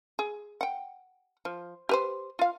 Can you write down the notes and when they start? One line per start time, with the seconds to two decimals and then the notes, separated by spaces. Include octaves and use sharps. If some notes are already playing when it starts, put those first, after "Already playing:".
0.19 G#4
0.61 F#5 G5
1.45 F3
1.89 G4 B4 C5
2.39 F4 F5